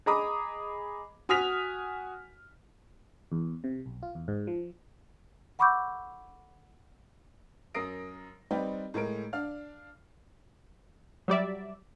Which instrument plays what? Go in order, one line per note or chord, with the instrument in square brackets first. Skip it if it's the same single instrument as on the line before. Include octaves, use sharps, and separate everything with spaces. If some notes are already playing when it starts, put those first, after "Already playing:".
[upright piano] G#4 D#5 A#5 B5 D6 D#6
F#4 G#5 D#6 F6 B6 F7
[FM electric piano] E2
C3
B1
F4
E2
G#2
F3
[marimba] F#5 B5 C#6 D6 E6 G6
[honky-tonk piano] F#2 A#4 D#6 A#6 C7 D7
G3 C4 D#4 B4 D5 G5
A2 G#3 A#4 D7
D4 D5 F5 F6
[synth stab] F#3 G3 D5 E5